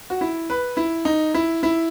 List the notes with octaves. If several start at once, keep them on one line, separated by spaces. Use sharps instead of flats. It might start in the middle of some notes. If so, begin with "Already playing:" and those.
F#4
E4
B4
E4
D#4
E4
E4